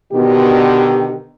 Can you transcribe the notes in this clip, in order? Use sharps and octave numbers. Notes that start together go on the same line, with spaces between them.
B2 D3 D#3 G4